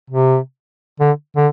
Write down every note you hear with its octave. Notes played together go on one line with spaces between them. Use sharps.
C3
D3
D3